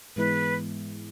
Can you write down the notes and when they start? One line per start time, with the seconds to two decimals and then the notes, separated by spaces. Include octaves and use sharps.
0.16 G#2 E3 G#3 B3 E4 B4